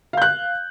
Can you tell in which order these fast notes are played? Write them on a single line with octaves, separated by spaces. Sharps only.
F5 G6 F#6